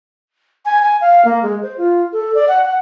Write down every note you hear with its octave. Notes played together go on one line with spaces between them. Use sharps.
G#5
G#5
F5
A#3
G#3
C5
F4
A4
D5
F#5
F#5